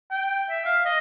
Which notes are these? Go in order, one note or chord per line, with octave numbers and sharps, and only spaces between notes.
G5
E5
F5
D#5